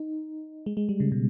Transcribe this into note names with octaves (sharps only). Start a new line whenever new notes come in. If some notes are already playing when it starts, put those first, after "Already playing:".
Already playing: D#4
G#3
G#3
G3
C#3
B2